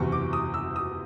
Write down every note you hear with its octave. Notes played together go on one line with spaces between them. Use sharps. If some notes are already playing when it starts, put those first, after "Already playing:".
Already playing: F#1 E2 C3 C#6
D6
D#6
E6
D#6